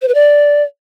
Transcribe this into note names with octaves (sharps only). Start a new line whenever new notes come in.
C5
B4
D5